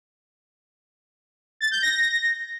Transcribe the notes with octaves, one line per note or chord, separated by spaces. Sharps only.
A6
G6
A#6